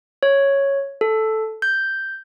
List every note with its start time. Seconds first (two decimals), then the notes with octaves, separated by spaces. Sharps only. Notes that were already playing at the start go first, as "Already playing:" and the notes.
0.23 C#5
1.01 A4
1.62 G6